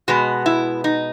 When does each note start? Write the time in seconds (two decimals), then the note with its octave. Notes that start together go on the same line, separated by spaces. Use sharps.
0.08 B2 G#3 B3 F#4
0.46 E4
0.84 D#4